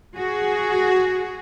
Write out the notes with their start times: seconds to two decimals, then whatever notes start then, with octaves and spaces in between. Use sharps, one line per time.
0.16 F#4 G#4